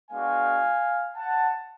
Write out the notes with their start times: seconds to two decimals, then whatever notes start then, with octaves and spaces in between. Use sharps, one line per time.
0.11 G#3 B3 D4 F#4 F5 G#5
1.17 F#5 A5